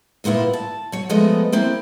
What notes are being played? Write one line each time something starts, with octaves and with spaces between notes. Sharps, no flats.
D2 A#2 B3 E4 F4
A5
F#3 C#5
F3 G#3 A3 B3 D#5
A#3 C4 E4